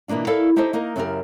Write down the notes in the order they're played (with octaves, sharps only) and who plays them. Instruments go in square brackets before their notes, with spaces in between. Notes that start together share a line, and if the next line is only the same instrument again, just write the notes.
[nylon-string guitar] B2 E3 A#3 D4 F4
E4 A4 A#4 D5 F5
D#4 E4 G4 A4 C5 D#5
A#3 D#4 A#4 D#5
F#2 C#3 E4 F4 G4 A#4